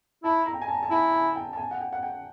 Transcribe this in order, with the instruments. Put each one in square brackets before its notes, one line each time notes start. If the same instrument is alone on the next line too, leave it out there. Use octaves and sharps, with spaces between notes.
[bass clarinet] E4 [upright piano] A5
[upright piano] A#5
G5
G#5
A5
A5
[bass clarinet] E4 [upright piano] G#5
[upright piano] G#5
G5
A5
G#5
F#5
G5
F#5
G5